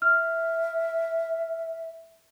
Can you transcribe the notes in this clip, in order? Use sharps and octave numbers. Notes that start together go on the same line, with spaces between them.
E5 F6